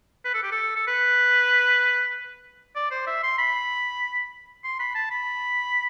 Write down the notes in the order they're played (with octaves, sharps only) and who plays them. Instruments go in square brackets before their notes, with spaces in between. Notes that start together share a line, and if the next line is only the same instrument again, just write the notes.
[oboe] B4
A4
G4
A4
A4
B4
D5
C5
E5
C6
B5
C6
B5
A5
B5